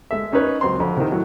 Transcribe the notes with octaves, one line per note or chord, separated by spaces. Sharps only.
G#3 A4 E5
C#4 D#4 A#4 B4 C#5
C#2 F#3 C4 C6
F2 D3
C3 D#3
A2 F#3